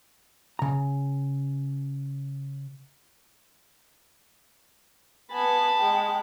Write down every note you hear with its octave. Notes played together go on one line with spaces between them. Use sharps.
C#3 A#5
B3 G#5 A5 B5
G#3 G5